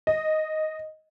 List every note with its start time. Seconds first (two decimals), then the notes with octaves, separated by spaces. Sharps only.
0.07 D#5